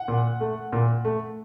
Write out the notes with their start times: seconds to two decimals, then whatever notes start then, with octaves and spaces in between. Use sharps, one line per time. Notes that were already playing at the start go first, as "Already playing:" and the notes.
Already playing: F#5
0.08 A#2
0.40 A3
0.73 A#2
1.05 A3